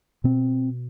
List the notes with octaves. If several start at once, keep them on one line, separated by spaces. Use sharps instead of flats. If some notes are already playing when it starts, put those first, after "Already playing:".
B2 C4